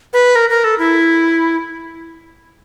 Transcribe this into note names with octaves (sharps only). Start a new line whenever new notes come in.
B4
A#4
A#4
A4
E4